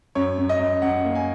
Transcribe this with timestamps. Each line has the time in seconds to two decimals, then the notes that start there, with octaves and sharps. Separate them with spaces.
0.15 F#2 C#5
0.38 F#2
0.49 D#5
0.59 F#2
0.82 F#2 F#5
1.05 A#3
1.15 G#5